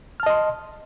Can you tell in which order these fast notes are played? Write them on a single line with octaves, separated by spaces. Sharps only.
F6 A5 D#5 C6